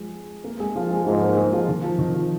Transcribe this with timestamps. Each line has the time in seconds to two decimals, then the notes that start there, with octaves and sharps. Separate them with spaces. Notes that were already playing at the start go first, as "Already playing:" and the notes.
Already playing: F3 G#3 G#4
0.44 A#3 A#4
0.60 G#3 G#4
0.75 F3 F4
0.91 G#3 G#4
1.06 G#2 F3 F4
1.21 A#3 A#4
1.37 G#3 G#4
1.52 F3 F4
1.69 D#3
1.84 F3
1.99 D#3
2.15 F3